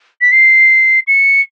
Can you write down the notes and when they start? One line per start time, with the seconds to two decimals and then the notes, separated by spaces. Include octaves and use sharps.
0.21 B6
0.31 C7
1.07 C#7